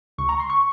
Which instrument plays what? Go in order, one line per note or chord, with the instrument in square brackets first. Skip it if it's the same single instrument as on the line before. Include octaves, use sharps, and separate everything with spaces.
[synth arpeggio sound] C#2 C#6
A#5
C6
C#6